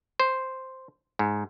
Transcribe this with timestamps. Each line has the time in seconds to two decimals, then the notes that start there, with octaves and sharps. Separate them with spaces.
0.20 C5
1.19 G#2